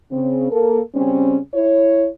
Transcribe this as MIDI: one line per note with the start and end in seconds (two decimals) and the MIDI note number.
0.11 0.49 49
0.11 0.49 60
0.51 0.80 58
0.51 0.80 69
0.51 0.80 70
0.95 1.38 49
0.95 1.38 55
0.95 1.38 60
0.95 1.38 61
1.54 2.08 64
1.54 2.08 73